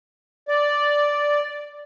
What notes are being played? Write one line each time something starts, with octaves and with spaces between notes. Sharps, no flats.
D5